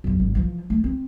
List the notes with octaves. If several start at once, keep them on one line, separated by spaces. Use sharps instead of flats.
E1 F#2
G#1
E3 F3
A3
C4